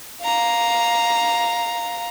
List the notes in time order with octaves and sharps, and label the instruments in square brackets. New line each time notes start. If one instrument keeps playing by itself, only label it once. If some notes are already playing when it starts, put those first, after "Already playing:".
[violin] F5 A#5